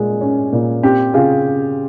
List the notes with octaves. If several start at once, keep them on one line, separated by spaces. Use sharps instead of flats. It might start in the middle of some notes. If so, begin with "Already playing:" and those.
Already playing: A#2 G#3
C#4
A#2
C4 G4
C#3 F4 G#4